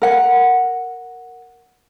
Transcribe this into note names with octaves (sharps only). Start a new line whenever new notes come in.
A#4 F#5